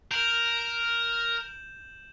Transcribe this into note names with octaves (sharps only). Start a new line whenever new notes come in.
A#4 G6 E7 F#7